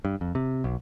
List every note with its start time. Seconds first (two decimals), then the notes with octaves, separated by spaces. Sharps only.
0.05 G2
0.21 F2
0.35 C3
0.64 B1